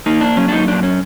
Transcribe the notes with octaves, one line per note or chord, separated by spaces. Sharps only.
A#3 D#4
D4
F#3 C#4
D4
D#4
F#2 D4
C#4